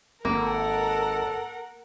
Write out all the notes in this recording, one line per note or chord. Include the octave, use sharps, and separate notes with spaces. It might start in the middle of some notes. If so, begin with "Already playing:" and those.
G#1 A#3 A4 A#4 F#5